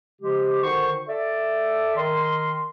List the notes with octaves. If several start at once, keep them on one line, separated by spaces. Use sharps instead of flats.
C#3 F3 G#3 G4
D3 D#3 D#4 F#4 C5 C#6
A4 D5 E5
D#3 A#4 D#5 C6